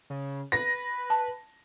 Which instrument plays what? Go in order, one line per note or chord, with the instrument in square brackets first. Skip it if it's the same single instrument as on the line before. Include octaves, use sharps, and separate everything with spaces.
[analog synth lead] C#3
[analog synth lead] B4 [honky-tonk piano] A#6
[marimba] A5